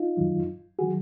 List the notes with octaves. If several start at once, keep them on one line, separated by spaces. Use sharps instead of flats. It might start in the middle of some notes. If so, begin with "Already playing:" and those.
Already playing: D#4 F4
F#2 D#3 F#3
D#3 F#3 F#4 G#4